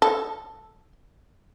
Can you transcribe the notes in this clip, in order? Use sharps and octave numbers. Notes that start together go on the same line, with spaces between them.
A4